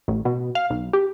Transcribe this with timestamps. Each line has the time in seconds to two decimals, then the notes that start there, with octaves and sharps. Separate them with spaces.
0.08 A1
0.25 B2
0.55 F5
0.70 B1
0.93 G4